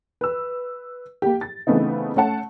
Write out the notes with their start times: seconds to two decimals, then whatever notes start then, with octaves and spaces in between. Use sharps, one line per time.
0.21 B4 E6
1.22 A#3 G4
1.41 A6
1.67 C#3 E3 A3 B3 C4 D#4
2.16 A3 C#4 F#5 A5